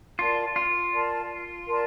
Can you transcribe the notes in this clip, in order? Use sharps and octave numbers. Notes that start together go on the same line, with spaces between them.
F4 A#4 D5 A5 C6
F4
A#4 D5 A5 C6
A#4 D5 A5 C6